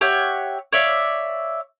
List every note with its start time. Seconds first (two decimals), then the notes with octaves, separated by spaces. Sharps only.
0.01 G4 C#5 E5 F#5
0.73 C#5 D5 E5 F5